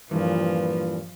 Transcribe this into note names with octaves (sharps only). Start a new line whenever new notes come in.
G2 A#2 E3 F3 B4